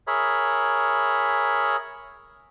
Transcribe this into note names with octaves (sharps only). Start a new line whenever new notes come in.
G#4 A#4 C#5 E5 B5